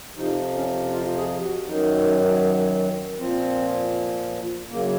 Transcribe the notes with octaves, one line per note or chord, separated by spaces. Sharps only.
F2 C3 F3 D#4
C#4
F4
G#4
F#4
F#2 D#3 F#3 D#4
A#2 F3 C4
F#2 C#3 F#3 A#3